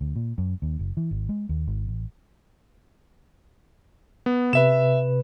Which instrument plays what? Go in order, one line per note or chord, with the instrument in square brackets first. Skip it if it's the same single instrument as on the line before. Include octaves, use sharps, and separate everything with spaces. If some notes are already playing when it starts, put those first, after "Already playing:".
[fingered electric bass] D2
A#2
F#2
D#2
F#1
E3
G#1
G#3
D#2
G#1
A1
[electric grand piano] B3
[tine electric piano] C3 B4 [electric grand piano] E5 E7